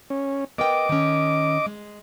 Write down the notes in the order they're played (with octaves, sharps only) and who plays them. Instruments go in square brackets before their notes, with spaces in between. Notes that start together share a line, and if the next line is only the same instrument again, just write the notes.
[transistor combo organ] C#4
[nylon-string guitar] B3 A#4 G5 [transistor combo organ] D#5 D6
[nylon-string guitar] D#3 C#4
G#3